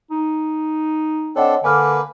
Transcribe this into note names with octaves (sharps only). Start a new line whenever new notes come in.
D#4
C4 D4 A4 C#5 D#5 F#5
D3 A#3 B4 G#5 D6 F6